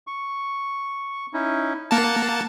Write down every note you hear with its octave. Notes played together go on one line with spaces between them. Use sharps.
C#6
C#4 D#4 E4
A#3 F#5 A5